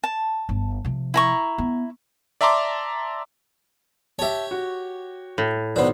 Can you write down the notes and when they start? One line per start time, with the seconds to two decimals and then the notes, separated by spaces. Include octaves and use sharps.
0.04 A5
0.49 G1
0.85 C3 F3
1.14 E4 A#5 C#6
1.58 B3
2.41 D5 E5 A5 A#5 C6 D6
4.19 G4 C#5 E5 A5
4.51 F#4
5.38 A2
5.76 B1 D#3 B3 D4 C5